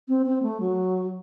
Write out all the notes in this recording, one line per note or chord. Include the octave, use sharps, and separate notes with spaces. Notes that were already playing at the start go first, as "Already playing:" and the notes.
C4
C4
A3
F#3